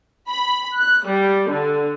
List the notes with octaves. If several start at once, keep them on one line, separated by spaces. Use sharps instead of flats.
B5
F#6
G3
D3